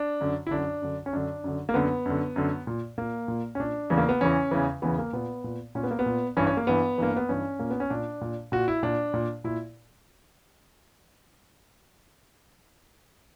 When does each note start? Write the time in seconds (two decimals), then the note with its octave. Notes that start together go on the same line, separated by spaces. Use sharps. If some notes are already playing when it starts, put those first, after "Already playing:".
Already playing: D4
0.21 F#2 D3
0.47 E4
0.51 F#2 D3 D4
0.82 F#2 D3
1.06 C#4
1.13 F#2 D3 D4
1.44 F#2 D3
1.69 A#3
1.74 F#2 D3 B3
2.06 F#2 D3
2.36 F#2 D3
2.67 A#2
2.98 A#2 A#3
3.28 A#2
3.55 C#4
3.59 A#2 D4
3.90 E2 C#3 E3
3.98 A#3
4.09 B3
4.21 E2 C#3 E3 C#4
4.51 E2 C#3 E3
4.82 E2 C#3 E3 B3
4.99 A#3
5.13 A#2 B3
5.44 A#2
5.75 A#2 C#4
5.83 B3
5.91 A#3
5.99 B3
6.06 A#2
6.37 G2 E3 C#4
6.47 C#4
6.57 A#3
6.67 G2 E3 B3
6.98 G2 E3 A#3
7.17 B3
7.29 G2 E3 C#4
7.59 A#2 A#3
7.70 B3
7.80 C#4
7.90 A#2 D4
8.21 A#2
8.52 A#2 F#4
8.68 E4
8.83 A#2 D4
9.14 A#2
9.44 A#2 E4